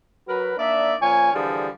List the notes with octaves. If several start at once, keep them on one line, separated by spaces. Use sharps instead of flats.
F#3 F#4 A#4 B4
A#3 D4 D#4 D5 E5
A#2 F3 C#4 C#5 G#5
D3 E3 F3 G3 G#4 A4